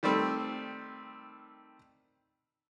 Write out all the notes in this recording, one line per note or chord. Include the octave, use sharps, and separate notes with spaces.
D#3 G3 A3 C4